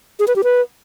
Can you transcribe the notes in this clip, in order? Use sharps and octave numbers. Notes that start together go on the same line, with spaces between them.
G#4
B4
G4
B4